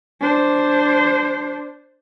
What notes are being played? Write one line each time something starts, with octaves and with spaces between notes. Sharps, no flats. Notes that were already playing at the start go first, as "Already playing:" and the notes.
D4 C5